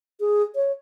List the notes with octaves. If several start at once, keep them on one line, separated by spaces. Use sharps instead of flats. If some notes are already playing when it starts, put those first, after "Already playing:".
G#4
C#5